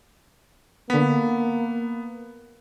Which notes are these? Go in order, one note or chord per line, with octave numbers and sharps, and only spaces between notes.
D3 A#3 B3 B6